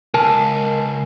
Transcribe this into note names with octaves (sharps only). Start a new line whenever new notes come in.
C#2 A#4 G#5 A5